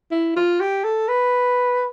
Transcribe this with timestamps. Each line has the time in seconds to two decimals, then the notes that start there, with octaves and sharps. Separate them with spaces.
0.12 E4
0.36 F4
0.60 G4
0.84 A4
1.09 B4